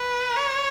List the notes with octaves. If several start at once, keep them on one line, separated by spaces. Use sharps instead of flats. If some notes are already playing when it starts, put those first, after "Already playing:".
Already playing: B4
C#5